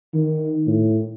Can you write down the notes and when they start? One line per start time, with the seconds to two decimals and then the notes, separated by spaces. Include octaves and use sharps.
0.14 D#3
0.67 A2